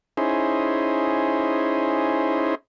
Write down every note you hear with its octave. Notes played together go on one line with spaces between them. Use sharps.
C#4 D#4 E4 G#4 C5